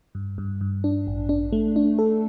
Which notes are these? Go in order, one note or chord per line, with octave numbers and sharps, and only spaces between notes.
G2
G2
G2
D4
A1
D4
A3
D4
A4